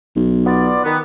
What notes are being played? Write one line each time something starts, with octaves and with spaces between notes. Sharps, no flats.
B1
B3 F4 D5
D#3 B3